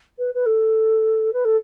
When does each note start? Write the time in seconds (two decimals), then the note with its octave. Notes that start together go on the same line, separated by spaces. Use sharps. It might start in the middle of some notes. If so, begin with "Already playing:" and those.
0.19 B4
0.34 B4
0.46 A4
1.33 B4
1.45 A4